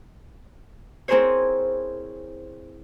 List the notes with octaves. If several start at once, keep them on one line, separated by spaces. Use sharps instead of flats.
C4 E4 G#4 A#4 C5 C#5